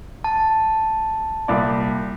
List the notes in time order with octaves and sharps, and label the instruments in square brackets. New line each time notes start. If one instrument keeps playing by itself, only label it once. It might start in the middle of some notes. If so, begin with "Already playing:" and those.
[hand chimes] A5
[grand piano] C2 A#2 D5